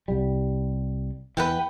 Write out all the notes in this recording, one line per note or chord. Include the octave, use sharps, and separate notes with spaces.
C2 G3
E2 E3 B4 F#5 G5